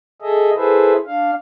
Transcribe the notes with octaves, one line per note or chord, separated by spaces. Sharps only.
G#4 A4 D#5 E5
E4 G#4 A4 B4 C5 E5
D4 F5